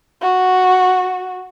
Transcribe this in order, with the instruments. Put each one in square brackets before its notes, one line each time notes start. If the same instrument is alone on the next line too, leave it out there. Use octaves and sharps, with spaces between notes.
[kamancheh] F#4